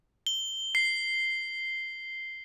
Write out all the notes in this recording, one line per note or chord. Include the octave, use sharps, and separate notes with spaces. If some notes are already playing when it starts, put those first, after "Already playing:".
G7
C7